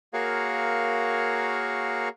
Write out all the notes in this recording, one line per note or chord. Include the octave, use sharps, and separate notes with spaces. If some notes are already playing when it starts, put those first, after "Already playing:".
A#3 F#4 G#4 A#4 C#5 F5